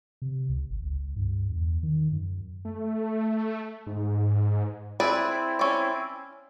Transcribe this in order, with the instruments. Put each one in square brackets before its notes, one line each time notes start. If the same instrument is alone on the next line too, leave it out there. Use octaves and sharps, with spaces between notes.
[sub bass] C3
C#2
G#1
C#2
G2
E2
D#3
F#2
[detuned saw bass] A3
G#2
[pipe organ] C4 E4 [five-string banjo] G#4 B4 D5
[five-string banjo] C#4 D5